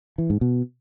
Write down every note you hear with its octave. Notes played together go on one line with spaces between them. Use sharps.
E3
G#2
B2